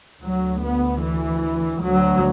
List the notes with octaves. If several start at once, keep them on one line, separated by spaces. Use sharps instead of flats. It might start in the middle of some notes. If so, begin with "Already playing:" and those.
D2 F#3
B3
E3
D2 F#3